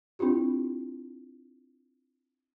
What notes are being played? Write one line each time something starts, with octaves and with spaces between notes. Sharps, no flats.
C4 D4 E4 F4 G4